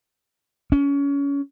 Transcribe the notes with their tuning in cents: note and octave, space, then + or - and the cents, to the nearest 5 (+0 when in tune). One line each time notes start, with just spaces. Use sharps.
C#4 +25